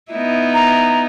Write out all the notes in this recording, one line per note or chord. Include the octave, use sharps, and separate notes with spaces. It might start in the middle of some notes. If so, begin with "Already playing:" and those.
B3 D#4 E4
A#5